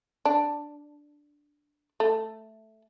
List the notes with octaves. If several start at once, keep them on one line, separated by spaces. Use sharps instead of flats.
D4
A3